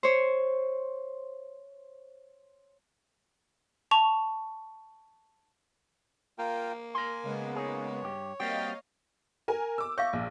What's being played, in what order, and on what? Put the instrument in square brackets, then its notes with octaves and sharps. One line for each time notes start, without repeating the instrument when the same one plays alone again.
[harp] C5 C#5
[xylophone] A5 C#6 F7
[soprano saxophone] A#3 [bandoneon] F4 A#4 G5
[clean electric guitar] A#4 C6 [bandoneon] G#5
[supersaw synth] C#3 G#3 B3
[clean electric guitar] D#4 G#4 [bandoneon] C#5
[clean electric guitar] G2 G4
[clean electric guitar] G3 C4 F#4 [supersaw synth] A#3 D#5 F5 [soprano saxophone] G5
[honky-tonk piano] A#4 G#5
D6 E6
[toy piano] C#5 E5 F5 [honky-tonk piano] C#6
[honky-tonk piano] A#1